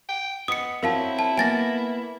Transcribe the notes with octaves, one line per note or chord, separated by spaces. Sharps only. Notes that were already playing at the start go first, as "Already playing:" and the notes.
G5
B3 D#5 D#6 C#7
C4 E4 F#4 A#4 C#5 F5 A5
A5
A#3 B3 G#5 A6 A#6